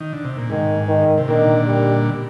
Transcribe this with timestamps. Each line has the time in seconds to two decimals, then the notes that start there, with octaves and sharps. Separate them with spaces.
0.00 D#3
0.13 D3
0.25 C3
0.38 A#2
0.50 G#2 D#3
0.89 D#3
1.18 C3
1.28 A#2 D3 D#3
1.67 G3